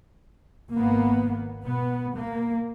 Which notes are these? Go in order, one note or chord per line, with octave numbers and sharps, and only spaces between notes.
G#1 A#3 B3
B2 B3
A#3